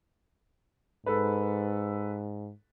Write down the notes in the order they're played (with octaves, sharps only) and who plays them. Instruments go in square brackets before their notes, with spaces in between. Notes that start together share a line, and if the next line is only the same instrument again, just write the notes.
[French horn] G#2 [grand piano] A4 B4